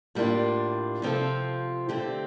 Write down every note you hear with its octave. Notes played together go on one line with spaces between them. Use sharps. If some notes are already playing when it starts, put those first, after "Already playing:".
A2 G3 A#3 D4 F4
C3 F3 C4 F4 A4
D3 A3 C4 G4